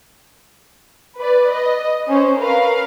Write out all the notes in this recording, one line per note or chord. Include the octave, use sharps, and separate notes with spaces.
B4 D5
D#5
C#4 C5
A#4 B4 F5